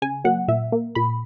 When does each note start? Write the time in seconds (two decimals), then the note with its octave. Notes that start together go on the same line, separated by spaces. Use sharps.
0.02 C#3 G#5
0.24 F#3 A#3 F#5
0.48 A#2 E5
0.72 A#3
0.95 A#2 B5